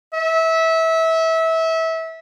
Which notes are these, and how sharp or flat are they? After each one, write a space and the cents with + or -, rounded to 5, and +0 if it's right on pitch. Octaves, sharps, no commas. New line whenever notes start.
E5 -25